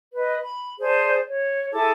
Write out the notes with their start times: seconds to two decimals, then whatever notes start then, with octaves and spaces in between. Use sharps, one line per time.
0.14 B4 D#5
0.41 B5
0.80 G#4 C5 D5 A5
1.28 C#5
1.72 E4 G#4 A4 D6